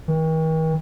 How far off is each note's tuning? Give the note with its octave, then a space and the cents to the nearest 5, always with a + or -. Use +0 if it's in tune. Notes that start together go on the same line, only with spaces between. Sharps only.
D#3 +45